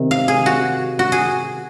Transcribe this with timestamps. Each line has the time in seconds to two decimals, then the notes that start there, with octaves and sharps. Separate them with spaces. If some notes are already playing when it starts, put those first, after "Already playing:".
Already playing: C3 D#3
0.11 F5
0.28 G#4
0.46 F#4
0.99 F#4
1.12 G#4